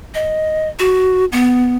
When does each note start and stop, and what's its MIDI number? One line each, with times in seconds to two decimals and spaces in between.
0.14 0.69 75
0.79 1.25 66
1.32 1.77 59